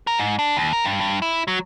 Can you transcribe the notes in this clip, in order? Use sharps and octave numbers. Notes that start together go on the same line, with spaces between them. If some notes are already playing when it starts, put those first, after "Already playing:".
A#4
G#2
D4
D#2
A#4
G2
G2
E4
F#3